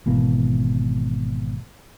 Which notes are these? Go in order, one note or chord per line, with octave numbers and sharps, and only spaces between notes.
G#1 B2 E3 A#3